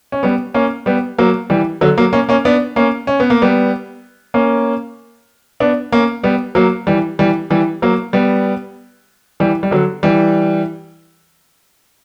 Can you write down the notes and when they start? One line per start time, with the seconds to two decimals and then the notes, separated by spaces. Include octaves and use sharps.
0.12 C#4
0.23 G3 B3
0.54 A#3 C#4
0.86 G3 B3
1.18 F#3 A#3
1.50 E3 G3
1.81 D3 F#3
1.98 F#3 A#3
2.13 A#3 C#4
2.29 A#3 C#4
2.45 B3 D4
2.76 A#3 C#4
3.07 C#4
3.20 B3
3.30 A#3
3.42 G3 B3
4.34 A#3 C#4
5.60 B3 D4
5.92 A#3 C#4
6.24 G3 B3
6.55 F#3 A#3
6.87 E3 G3
7.19 E3 G3
7.50 E3 G3
7.82 F#3 A#3
8.13 G3 B3
9.40 E3 G3
9.63 G3
9.71 D3 F#3
10.03 E3 G3